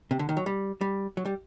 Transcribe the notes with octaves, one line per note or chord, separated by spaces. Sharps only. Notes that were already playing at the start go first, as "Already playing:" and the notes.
C3
D3
D#3
F#3
G3
G3
F#3
G3